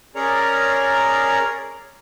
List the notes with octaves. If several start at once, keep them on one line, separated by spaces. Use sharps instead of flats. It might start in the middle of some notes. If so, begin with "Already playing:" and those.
C#4 G#4 A#4 C#5 D5 A#5